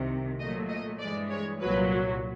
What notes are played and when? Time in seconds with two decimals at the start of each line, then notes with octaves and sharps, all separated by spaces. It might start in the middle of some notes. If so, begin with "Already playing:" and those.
Already playing: C2 C3 D#3
0.39 A#2 F#3 A3 D#5
0.70 D#5
1.00 G2 E3 G#3 D5
1.31 C#5
1.61 C2 A#2 F#3 B4